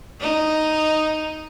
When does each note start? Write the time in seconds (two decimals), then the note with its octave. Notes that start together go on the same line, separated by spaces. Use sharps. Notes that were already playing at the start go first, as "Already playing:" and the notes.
0.21 D#4